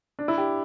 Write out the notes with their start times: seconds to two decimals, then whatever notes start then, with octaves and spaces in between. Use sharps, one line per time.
0.19 D4
0.28 E4
0.38 G4